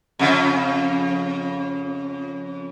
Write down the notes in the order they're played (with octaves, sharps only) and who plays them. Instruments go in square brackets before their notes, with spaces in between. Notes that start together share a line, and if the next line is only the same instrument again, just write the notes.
[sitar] F2 C#3